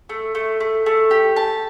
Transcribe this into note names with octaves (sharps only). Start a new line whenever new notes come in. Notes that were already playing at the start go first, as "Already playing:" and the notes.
A3
A3
A3
A3
G4
A5